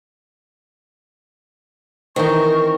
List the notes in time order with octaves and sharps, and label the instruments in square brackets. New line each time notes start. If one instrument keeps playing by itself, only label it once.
[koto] D#3 E3 D#4 [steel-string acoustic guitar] C4 [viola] A#4 [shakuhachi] C#6